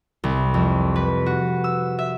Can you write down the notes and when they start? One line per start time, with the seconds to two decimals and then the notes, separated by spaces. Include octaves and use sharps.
0.24 C2
0.54 F2
0.96 B4
1.26 F#4
1.64 E6
1.99 E5